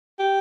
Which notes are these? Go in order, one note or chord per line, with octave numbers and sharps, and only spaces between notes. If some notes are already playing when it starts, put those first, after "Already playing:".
G4